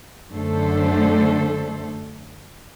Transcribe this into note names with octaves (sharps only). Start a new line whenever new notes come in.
F#2 D3 A3 A4 C5